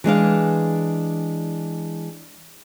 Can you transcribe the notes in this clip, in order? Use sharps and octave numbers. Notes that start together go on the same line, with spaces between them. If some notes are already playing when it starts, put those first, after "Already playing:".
E3 G#3 D4 F5